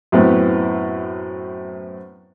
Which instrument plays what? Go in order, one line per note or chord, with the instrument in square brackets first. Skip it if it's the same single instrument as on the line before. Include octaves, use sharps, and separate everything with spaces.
[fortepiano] F#2 A2 B3 C4